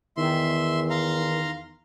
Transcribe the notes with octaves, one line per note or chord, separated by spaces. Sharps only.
E2 D#3 E5 C6
F5 A#5 C6